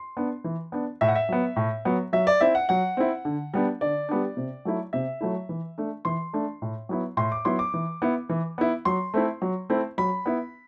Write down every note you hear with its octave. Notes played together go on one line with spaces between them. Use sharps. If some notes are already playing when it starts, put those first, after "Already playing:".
Already playing: C6
B3 D4
E3
B3 D4
A2 E5
F#5
E5
F#3 B3
A2
F#3 B3
F#3 E5
D5
C4 E4 E5
F#5
F#3 F#5
C4 E4
D3
G3 B3 D4
D3 D5
G3 B3 D4
C3
F#3 A3 E4
C3 E5
F#3 A3 E4
E3
A3 D4
E3 C6
A3 D4
A2
F#3 B3 E4
A2 C6
D6
F#3 B3 E4 C6
D6
E3
B3 E4
E3
B3 E4
F#3 C6
A3 C4 E4
F#3
A3 C4 E4
F#3 B5
B3 E4